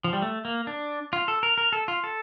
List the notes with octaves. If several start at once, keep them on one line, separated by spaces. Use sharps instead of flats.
F3
G3
A3
A#3
D4
F4
A4
A#4
A#4
A4
F4
A4